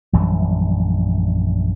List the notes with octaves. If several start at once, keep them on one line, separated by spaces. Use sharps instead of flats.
A#1 F#2 E3 G3